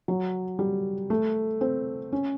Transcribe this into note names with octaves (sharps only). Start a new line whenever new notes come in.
F#3
G3
A3
C4
C#4